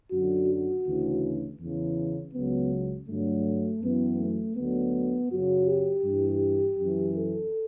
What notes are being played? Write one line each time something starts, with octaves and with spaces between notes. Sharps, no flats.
F#2 D3 F#3 F#4
F#4
D2 C#3 E3
E2 C#3 E3
C#2 C#3 F#3 B3
G2 D3 F#3 A3
F#2 E3 B3
A3
D2 D3 F#3 B3
F#2 C#3 F#3 F#4
G4
G2 E3
F#2 E3
A4